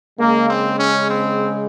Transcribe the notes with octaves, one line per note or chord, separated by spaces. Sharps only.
C#3 G#3 A#3
C4
C#4
C4